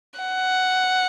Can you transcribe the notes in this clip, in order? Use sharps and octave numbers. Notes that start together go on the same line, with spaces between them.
F#5